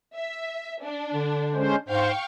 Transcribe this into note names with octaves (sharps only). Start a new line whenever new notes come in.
E5
D4
D3
G#3 C#4 C5
G#2 C5 F5 G5 C#6